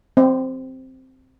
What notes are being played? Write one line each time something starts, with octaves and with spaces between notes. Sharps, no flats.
C4